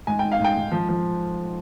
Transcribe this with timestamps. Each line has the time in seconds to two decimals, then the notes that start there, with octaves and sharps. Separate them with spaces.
0.07 G#2 G#5
0.19 G#1 G5
0.32 F5
0.40 G#2 G5
0.56 G#2
0.72 F3
0.89 F3